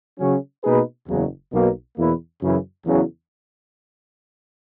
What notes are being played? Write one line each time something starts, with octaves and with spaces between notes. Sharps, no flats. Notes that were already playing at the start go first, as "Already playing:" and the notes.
C#3 F#3 C#4
B2 A#3 D#4 G#4 B4
F#1 E2 C#3 F#3
B1 B2 A#3
E2 B2 A#3 E4 B4
F#2 C#3 E3
E2 C#3 F#3